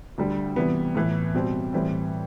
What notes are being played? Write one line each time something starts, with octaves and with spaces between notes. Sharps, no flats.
D2 D3 G3
C3 E3 G3 B3
A2 E3 B3
B2 G3 C4
A2 E3 G3 C4